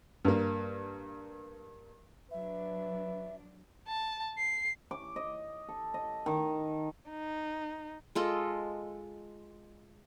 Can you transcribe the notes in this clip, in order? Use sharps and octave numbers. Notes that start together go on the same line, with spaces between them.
G2 A#3
F#3 D4 B4 E5
A5
C7
D6
D#5
A4
D#5
D#3
D#4
G#3 F4 A4 D#5